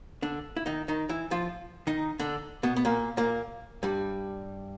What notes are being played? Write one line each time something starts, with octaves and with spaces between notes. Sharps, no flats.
D3 D4
E4
D#3 D#4
D#3 D#4
E3 E4
F3 F4
D#3 D#4
D3 D4
B2 B3
B3
A#2 A#3
A#2 A#3
G2 G3